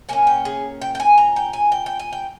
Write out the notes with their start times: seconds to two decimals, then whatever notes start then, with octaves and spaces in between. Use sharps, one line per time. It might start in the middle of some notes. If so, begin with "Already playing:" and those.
0.09 A#2 A#3 C#4 G#5
0.27 G5
0.45 G#4
0.81 G5
0.95 G5
1.00 G#5
1.18 A#5
1.36 G5
1.53 G#5
1.72 G5
1.86 G5
1.99 G#5
2.13 G5